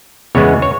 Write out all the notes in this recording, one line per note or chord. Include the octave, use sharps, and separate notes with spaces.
E2 C#3 G#3 B3 C#5
C#5